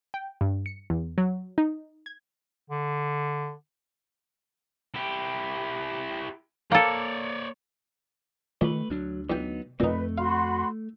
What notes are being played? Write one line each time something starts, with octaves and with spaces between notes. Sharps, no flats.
G5
G2
C#7
E2
F#3
D#4
G#6
D3
E4 G4
A#3 A4 C#5 D5
C#2 D#3 A3 B4
D2 F#3 D4
E2 F#3 B3 D#4 G5
F2 A#2 A3 C4 D#4 B4
F#4 F5 B5 C6